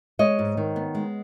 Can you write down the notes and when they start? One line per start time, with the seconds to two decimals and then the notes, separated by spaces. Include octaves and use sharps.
0.19 G#3 C#5 D#5
0.39 G#2
0.57 D#3
0.76 B3
0.95 G#3